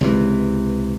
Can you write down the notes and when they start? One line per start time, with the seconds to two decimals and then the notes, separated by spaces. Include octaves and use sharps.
0.01 C#2 C3 E3